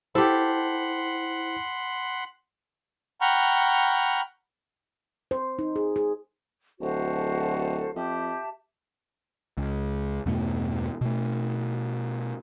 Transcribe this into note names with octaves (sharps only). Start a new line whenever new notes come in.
E4 G4 A4 C5 F#5 B5 C6
F#5 G5 A#5 B5 C#6 F6
C5
D#4
G#4
G#4
D1 F#4 A4 C5
F2 G4 E5 A5
C#2
E2 G2 B2 A3
B2 A3